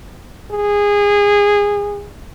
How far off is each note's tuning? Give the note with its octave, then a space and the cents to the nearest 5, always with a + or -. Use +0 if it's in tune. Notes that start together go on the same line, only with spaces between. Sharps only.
G#4 -20